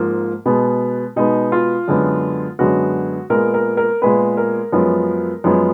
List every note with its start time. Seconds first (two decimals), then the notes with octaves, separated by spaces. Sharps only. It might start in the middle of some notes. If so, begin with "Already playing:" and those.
Already playing: G#2 F3 A#3
0.46 B2 G#3 B3
1.16 B2 G#3 B3 D#4
1.52 F4
1.88 F#2 D3 G#3 B3
2.59 F#2 D3 G#3 B3 F#4
3.30 A#2 G#3 B3 A#4
3.54 A#4
3.77 A#4
4.01 A#2 G#3 B3 B4
4.37 A#4
4.73 F#2 F3 G#3 B3
5.44 F#2 F3 G#3 B3